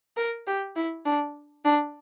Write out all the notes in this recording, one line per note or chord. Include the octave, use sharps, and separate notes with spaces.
A#4
G4
E4
D4
D4